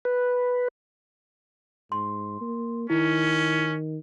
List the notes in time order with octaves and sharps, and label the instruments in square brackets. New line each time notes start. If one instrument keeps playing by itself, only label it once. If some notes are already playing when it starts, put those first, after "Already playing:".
[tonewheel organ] B4
[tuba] G#2 [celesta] C6
[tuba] A#3
[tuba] D#3 [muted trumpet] C#4 [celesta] E4